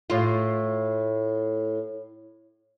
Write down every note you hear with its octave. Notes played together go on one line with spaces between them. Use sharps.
A2 F4